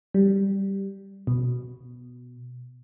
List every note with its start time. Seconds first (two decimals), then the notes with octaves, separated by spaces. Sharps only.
0.14 G3
1.27 B2